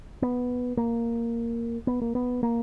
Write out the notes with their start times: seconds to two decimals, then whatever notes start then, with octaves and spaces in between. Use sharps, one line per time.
0.22 B3
0.77 A#3
1.87 B3
2.02 A#3
2.15 B3
2.43 A#3